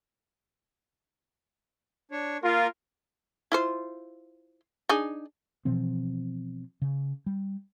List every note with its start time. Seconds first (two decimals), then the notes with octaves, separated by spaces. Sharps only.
2.11 D4 C#5
2.43 A#3 F4 A#4
3.52 E4 F4 C5
4.89 D4 D#4 G#4
5.65 B2 E3 F3 C4
6.82 C#3
7.26 G3